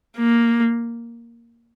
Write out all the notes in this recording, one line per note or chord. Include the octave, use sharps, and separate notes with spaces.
A#3